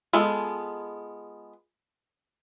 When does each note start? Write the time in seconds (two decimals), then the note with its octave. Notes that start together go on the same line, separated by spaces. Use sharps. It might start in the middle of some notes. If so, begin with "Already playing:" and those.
0.13 G#3 B3 F4 A4